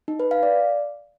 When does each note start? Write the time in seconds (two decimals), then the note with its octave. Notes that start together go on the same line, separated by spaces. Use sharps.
0.08 D#4
0.20 B4
0.31 F5
0.43 D5